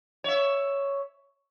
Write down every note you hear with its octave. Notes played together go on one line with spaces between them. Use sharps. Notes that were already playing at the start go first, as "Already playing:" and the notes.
C#5 E5